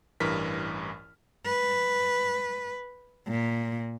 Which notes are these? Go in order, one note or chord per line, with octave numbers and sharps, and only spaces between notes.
A1 G2 E3 A#4 F6 B6
B4
A#2